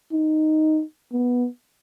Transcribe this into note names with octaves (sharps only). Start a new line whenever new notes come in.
D#4
B3